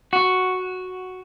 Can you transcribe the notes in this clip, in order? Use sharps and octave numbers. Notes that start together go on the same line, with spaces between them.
F#4